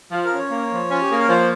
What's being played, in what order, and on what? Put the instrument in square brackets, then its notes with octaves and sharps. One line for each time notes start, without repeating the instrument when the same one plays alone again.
[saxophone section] F3
[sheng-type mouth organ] A#4
[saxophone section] C#4
[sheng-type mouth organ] C#5
[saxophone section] A#3
F3
[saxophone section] C#4 [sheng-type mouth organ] F4
[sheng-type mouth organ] G4
[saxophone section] A#3 [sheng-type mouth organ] G#4
[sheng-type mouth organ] A#4
[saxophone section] F3 [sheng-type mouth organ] C5